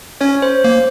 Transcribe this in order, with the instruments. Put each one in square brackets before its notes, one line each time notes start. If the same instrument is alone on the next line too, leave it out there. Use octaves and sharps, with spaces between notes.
[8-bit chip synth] C#4 [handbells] C#5
[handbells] C5
[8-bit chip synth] A#3